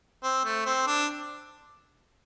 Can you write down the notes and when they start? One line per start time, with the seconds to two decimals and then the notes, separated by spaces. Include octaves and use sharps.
0.23 C4
0.45 A3
0.66 C4
0.87 D4